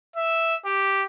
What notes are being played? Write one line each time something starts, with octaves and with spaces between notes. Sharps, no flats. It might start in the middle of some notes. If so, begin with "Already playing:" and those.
E5
G4